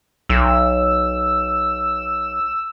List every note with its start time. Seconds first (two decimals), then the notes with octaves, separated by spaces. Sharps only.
0.29 B1 E6